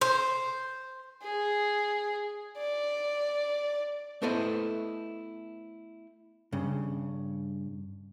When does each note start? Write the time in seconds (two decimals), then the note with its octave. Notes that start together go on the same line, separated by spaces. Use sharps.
0.01 C5
1.23 G#4
2.57 D5
4.22 A3 B3 E4 A4 C5 D#5
6.52 G2 C#3